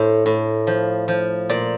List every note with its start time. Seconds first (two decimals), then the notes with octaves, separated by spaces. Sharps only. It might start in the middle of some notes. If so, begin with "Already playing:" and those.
Already playing: A2 C5
0.26 A2
0.67 F3
1.08 F3
1.49 A#2 D5